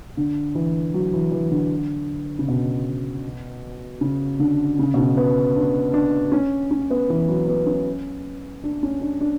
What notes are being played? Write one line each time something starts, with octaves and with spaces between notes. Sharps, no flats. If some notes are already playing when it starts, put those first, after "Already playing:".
D3
E3
F#3
E3
E3
D3
C#3
B2
C#3
D3
C#3
B2
C#3
B3
D4
D4
C#4
C#4
B3
E3
F#3
B3
C#4
D4
C#4
D4
D4